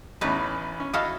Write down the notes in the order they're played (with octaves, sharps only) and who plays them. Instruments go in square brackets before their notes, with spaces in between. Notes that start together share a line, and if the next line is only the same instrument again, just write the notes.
[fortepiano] A1 E2 C#4 [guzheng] D#4 B4
[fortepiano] C#4
[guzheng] E4 F#4 A4 [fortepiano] D#5 F5